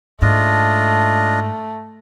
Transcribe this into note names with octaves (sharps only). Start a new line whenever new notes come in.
G#2 A3 D4 F4 D#5